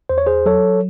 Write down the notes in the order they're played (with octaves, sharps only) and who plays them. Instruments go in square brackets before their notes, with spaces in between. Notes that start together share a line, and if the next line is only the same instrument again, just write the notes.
[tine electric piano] E2 C5
C#5
G#4 C5
F#3 A4 C#5